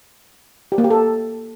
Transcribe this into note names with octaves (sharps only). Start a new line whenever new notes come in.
G4
A#3
G4
A4